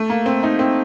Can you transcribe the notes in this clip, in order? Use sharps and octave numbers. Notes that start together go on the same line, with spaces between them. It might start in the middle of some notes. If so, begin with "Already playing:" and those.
Already playing: A3
A#3
C4
D#4
C4